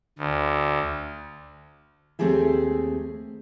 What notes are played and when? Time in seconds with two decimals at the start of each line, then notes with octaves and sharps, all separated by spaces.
0.18 D2
2.19 D#2 A3 C4 G4 G#4 E5